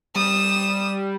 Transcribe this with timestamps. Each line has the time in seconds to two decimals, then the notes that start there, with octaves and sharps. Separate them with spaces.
0.16 G3 D#6 E7